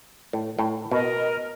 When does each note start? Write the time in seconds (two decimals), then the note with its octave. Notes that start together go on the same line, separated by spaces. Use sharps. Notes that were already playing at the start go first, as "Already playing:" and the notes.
0.33 A2
0.59 A2 G5
0.91 B2 A#4 D#5